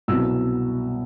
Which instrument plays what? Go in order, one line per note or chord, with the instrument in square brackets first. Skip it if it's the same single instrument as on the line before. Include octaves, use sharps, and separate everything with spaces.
[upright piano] C2 B2 F#3 E6